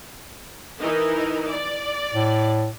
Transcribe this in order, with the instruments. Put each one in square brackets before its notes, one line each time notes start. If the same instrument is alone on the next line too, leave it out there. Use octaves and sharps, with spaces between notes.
[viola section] E3 D#4 A#4
D5
[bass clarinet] A2